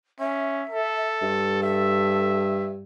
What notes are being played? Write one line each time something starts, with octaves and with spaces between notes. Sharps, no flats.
C#4 E5
A4
G2
A4 E5